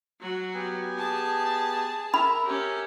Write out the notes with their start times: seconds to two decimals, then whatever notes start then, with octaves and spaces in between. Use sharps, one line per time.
0.21 F#3 F#4
0.54 B3 G4 G#5
0.98 G#4 A5
2.14 A#4 E5 B5
2.46 C#4 G4